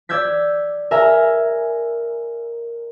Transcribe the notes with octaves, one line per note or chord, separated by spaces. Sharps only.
D5 E6 G6 G#6 B6
A#4 E5 G#5 A#5